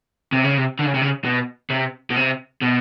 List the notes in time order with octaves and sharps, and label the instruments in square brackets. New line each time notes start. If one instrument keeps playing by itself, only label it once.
[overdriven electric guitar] C3
C#3
C3
D3
C#3
C3
C#3
B2
C3
B2
C3
B2